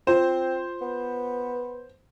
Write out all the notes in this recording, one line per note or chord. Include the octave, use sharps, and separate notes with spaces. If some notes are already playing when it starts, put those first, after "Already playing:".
C4 F4 C5 E7
B3